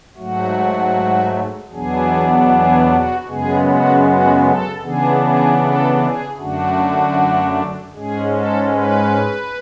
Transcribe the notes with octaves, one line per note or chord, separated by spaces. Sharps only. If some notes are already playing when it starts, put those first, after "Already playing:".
G#2 F#3 A3 F#4
E2 B2 F#3 B3 D4 G#4
G#4
F#4
F#2 C#3 G#3 B3 G#4
F#4
F#4
A4
C#3 E3 B3 D4 G#4
G#4
A4
G#4
F#2 D3 A3 D4 F#4
G#2 G#3 C#4 G#4
A4
B4